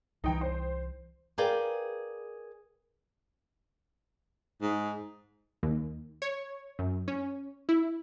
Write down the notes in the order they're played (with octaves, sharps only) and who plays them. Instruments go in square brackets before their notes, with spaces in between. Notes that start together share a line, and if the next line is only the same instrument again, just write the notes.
[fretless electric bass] C2 E3 [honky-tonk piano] D#4 G5
[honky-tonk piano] C5
[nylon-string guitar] G#4 A#4 B4 D5 F5 G5
[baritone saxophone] G#2
[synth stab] D#2
C#5
F#2
C#4
E4